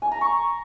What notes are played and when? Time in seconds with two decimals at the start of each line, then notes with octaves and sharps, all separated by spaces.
0.02 G#5
0.12 A#5
0.21 C#6